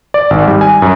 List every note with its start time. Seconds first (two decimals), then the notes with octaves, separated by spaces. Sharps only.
0.14 D5
0.30 G#1
0.48 G3
0.61 G#5
0.82 F#2